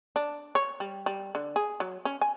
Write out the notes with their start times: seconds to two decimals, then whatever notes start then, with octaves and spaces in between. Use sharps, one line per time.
0.16 D4
0.55 C#5
0.80 G3
1.06 G3
1.35 D3
1.56 G#4
1.80 F#3
2.05 C#4
2.21 G#5